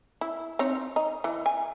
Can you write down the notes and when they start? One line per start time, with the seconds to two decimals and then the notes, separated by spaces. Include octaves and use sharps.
0.21 E4
0.59 C4 D#4 C#5
0.96 D#4
1.24 E3
1.46 G#5